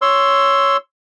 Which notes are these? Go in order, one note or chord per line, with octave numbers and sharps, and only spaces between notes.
C#5 C6 E6